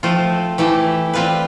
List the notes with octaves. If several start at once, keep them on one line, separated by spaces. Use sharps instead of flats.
F3 A3 C4 F4
E3 A3 E4 G4
G3 C4 F4 B4